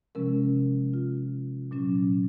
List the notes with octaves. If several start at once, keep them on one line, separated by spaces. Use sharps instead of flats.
C3 F3 G#3 C#4 A#4
F4
A#2 F#3 C#4